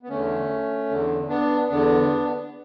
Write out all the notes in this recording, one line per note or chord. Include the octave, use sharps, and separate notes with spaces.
B3
E2 D3 A3 C#4
E2 D3
B3 D4
E2 D3 B3 D4